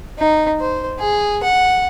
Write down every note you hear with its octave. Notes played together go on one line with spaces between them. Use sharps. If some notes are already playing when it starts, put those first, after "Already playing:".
D#4
C5
G#4
F#5